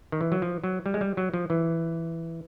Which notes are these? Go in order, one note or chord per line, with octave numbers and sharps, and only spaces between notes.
D#3
E3
F#3
F3
F#3
G3
G#3
G3
F#3
F3
E3